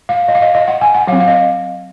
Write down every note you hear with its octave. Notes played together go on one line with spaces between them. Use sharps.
F5
D#5
F5
D#5
D#5
F#5
G#5
F#5
F#3 C4 F5
F5
D#5